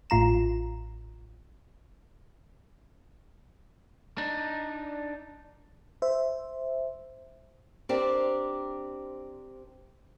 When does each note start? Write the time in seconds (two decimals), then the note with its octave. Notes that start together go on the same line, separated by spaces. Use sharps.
0.10 A1 A2 F4 A#5 E7
4.18 D4 D#4
6.02 C5 E5
7.89 C4 D4 G4 A#4 C5 D5